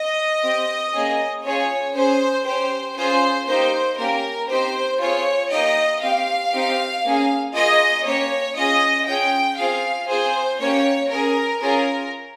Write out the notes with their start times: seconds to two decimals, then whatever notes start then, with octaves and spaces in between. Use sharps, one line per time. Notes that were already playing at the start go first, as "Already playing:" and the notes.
Already playing: D#5
0.42 C4 G4
0.93 A#3 C#4 G#4
1.44 C#4 F4 G#4 C#5
1.94 C#4 G#4 C5
2.46 C#4 G4 C5
2.96 C#4 F4 G#4 C5
3.47 A#3 D#4 G4 C5
3.98 A#3 C#4 G4 A#4
4.49 C4 D#4 G4 C5
5.00 C4 F4 G#4 C#5
5.51 A#3 D#4 G4 D#5
6.02 C4 G4 F5
6.52 C4 D#4 G4
7.04 A#3 C#4 G#4
7.54 A#3 F4 G#4 D#5
8.05 A#3 C#4 G4 C#5
8.56 C#4 F4 G#4 D#5
9.07 C#4 F4 G#4 G5
9.58 C4 F4 G#4 F5
10.09 C4 F4 G#4 C5
10.60 A#3 C#4 G4 C#5
11.10 C#4 G#4 A#4
11.61 C#4 F4 G#4 A#4